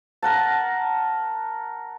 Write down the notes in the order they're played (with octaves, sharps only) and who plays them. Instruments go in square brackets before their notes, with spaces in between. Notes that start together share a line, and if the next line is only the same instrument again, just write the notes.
[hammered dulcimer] A#4 F#5 A5